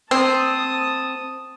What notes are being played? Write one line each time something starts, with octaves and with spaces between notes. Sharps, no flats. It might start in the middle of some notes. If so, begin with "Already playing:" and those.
C4 A5 D#6